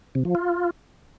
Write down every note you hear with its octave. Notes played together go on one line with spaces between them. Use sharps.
C3
F3
F4